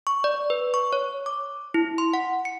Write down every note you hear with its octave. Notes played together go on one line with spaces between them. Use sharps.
C#6
D5
B4
C#6
C#5
D6
E4
C6
F#5
C#7